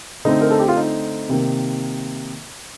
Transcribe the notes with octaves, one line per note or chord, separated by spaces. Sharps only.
D3 A3 C4 D#4
A#4
A4
G4
F4
D#4
C3 D#3 A#3